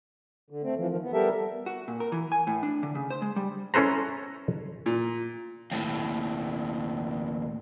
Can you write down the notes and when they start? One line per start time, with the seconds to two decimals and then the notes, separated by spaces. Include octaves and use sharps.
0.51 D3
0.63 A3 C4
0.78 E3 F3
0.89 D#3 F3
1.02 B3
1.13 G3 B3 G4 A4 A#4 E5
1.66 F#4
1.88 A#2
2.00 A#4
2.12 E3
2.32 G#5
2.47 A2
2.63 D4
2.83 D3
2.95 C#3
3.10 C5
3.22 G#3
3.36 G3
3.74 C#4 E4 A4 B4 C5 A#5
4.86 A#2
5.71 D#2 A2